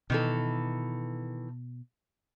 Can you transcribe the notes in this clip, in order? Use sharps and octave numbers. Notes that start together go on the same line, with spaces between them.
B2 D#3 E3 A4